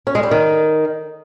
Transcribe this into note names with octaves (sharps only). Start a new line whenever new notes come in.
C#4
G#3
G3
D#3